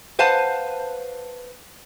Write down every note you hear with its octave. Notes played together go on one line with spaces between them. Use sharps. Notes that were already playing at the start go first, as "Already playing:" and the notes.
B4 C5 F5 F#5 A5